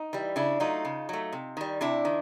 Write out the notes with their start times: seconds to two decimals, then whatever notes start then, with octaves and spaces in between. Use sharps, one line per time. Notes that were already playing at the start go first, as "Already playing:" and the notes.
Already playing: D#4
0.13 E3 G3
0.36 C#3 D4 E4
0.60 F#3 A3 D#4 F4
0.85 C#3
1.09 F#3 A3
1.32 C3
1.57 D#3 G3
1.81 C3 D4 E4
2.05 D#3